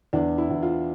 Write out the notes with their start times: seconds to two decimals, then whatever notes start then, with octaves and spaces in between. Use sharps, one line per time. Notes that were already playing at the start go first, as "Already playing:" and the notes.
0.13 E2 D4
0.38 E4
0.50 E2
0.63 F4